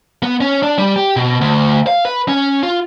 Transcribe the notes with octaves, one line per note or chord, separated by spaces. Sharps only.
B3
C#4
D4
G3
G4
B2
D2
F5
B4
C#4
F4